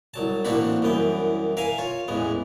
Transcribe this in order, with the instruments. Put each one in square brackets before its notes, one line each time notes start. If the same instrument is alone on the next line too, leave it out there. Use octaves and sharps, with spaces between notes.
[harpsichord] C2 F#3 A5
A1 A#3 C4 D4 F#4 B5
C2 F#2 E3 B3 G5
A#4 E5 F5 G#5
F4 C#5
A1 E2 E3 G#3